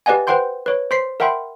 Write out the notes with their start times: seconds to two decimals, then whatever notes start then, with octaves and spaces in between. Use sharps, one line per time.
0.06 G4 B4 D5 D#5 F#5 G#5
0.27 B4 C5 F#5 G5 C6 G6
0.66 B4 C#5
0.91 C5 C6 B6 C7
1.20 A#4 E5 F#5 G5 B5 C6